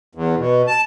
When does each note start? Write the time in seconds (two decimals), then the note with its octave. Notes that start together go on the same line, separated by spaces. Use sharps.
0.15 E2
0.38 B2
0.67 A5